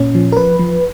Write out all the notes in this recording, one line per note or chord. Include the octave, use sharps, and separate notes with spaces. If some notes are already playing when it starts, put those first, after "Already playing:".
Already playing: A#2 C#4
F3
A#4
F3 B4
F3